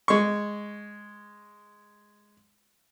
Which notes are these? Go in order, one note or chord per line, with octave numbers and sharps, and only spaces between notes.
G#3 C#6